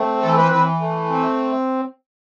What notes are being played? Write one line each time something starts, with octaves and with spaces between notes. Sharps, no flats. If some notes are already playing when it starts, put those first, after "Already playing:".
Already playing: A3 C4
E3 A4
B4
E3 B4
A3
C4